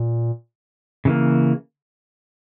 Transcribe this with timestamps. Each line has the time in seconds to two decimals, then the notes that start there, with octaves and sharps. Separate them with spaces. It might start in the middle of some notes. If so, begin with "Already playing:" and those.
Already playing: A#2
1.05 C#3 E3 A#3